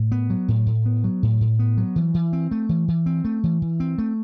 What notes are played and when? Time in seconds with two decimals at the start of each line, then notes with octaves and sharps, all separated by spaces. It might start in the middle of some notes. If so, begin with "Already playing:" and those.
Already playing: A2
0.12 B3
0.30 F#3
0.48 A2
0.67 A2
0.86 B3
1.04 F#3
1.23 A2
1.41 A2
1.59 B3
1.77 F#3
1.96 E3
2.14 E3
2.33 C4
2.51 A3
2.69 E3
2.88 E3
3.06 C4
3.25 A3
3.44 E3
3.62 E3
3.80 C4
3.98 A3